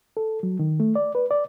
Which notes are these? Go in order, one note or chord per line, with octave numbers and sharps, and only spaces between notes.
A4
F#3
D#3
A3
D5
B4
D5